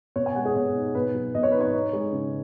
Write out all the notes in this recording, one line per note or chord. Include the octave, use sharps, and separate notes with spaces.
B2 C#5
G#5
G#3 F#5
G#4
B2 C#5
D#4
B2 B4
F#3
B2 D#5
C#5
D#4 B4
C#5
D#4
G#3
C#3